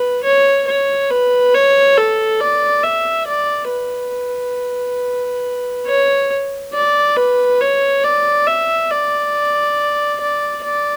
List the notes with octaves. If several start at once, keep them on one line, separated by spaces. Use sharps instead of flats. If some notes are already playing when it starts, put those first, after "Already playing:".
Already playing: B4
C#5
C#5
B4
C#5
A4
D5
E5
D5
B4
C#5
D5
B4
C#5
D5
E5
D5
D5
D5